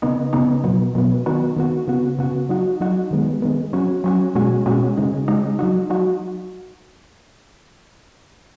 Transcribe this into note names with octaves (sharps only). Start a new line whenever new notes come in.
C#3 B3 D#4
C#3 B3 D#4
B2 F#3 B3
B2 F#3 B3
D#3 B3 F#4
D#3 B3 F#4
C#3 B3 F#4
C#3 B3 F#4
F#3 D#4 F#4
F#3 D#4 F#4
D#3 G#3 B3
D#3 G#3 B3
F#3 C#4 F#4
F#3 C#4 F#4
B2 G#3 C#4 F#4
B2 G#3 C#4 F#4
C#3 G#3 D#4
C#3 G#3 D#4
F#3 D#4 F#4
F#3 D#4 F#4